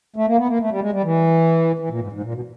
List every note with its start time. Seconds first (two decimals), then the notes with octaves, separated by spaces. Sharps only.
0.16 A3
0.27 A#3
0.38 B3
0.49 A#3
0.60 A3
0.70 G3
0.81 G#3
0.92 G3
1.03 E3
1.79 E3
1.90 A#2
2.01 G#2
2.12 G#2
2.23 A#2
2.34 B2